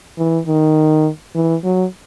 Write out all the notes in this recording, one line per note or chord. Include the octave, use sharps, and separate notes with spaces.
E3
D#3
E3
F#3